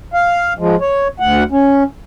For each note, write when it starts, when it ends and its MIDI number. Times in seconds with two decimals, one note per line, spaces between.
0.14 0.53 77
0.59 0.76 53
0.59 0.76 56
0.81 1.08 73
1.20 1.43 38
1.20 1.43 78
1.52 1.83 61